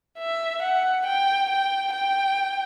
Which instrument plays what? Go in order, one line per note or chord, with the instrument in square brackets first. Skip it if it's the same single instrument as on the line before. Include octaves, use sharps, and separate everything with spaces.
[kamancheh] E5
F#5
G5
G5
G5